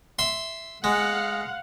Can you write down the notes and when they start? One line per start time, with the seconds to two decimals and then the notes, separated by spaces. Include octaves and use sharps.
0.19 E5 C6
0.84 G#3 F5 F#5